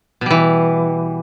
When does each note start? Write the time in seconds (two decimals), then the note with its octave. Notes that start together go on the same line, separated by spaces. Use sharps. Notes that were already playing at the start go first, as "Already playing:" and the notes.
0.21 B2
0.26 G3
0.31 E3